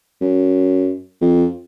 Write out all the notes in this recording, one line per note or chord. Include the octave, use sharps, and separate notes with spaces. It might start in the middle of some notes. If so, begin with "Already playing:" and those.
F#2
F2